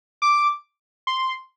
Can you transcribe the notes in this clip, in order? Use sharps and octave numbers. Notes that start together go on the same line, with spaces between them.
D6
C6